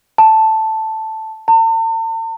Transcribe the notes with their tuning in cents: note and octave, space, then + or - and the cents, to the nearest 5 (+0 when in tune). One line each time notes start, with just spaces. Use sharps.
A5 +0
A5 +45